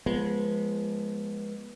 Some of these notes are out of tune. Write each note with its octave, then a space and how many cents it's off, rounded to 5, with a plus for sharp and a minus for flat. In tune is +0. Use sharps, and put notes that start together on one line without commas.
F3 +0 G#3 +0 B3 -30